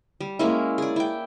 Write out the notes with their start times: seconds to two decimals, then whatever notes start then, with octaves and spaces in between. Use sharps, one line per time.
0.21 G3
0.39 G#3 A#3 C#4 E4
0.78 G#4 D5
0.96 E4 G5